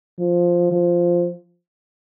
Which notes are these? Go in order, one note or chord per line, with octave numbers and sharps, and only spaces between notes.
F3
F3